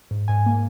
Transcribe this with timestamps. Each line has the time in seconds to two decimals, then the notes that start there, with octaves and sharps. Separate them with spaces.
0.11 G#2
0.28 G#2 G#5
0.46 A#3